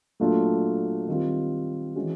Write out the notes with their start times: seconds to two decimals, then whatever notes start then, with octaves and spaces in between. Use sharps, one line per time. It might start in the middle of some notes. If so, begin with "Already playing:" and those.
0.20 A#2 F#3 A3 D4 F4
1.07 D#3 G3 C4 F4
1.95 E3 G#3 C#4 F#4